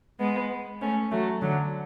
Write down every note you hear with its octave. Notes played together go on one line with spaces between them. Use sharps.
G#3 B3
A3 C#4
F#3 A3
D3 F#3